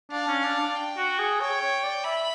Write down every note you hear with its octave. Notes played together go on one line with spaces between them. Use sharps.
D4 F5
C#4
D4
D4
G5
F#4
G#4
C#5 G5
C#5
D5
E5 B5